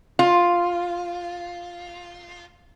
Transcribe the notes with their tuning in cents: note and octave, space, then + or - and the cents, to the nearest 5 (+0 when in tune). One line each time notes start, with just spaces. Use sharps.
F4 +5